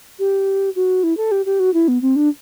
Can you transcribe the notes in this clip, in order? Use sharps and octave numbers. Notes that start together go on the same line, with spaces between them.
G4
F#4
E4
A4
G4
G4
F#4
E4
B3
C4
D4